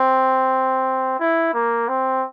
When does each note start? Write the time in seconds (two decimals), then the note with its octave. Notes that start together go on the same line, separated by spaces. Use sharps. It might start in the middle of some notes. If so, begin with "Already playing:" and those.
Already playing: C4
1.19 E4
1.54 A#3
1.88 C4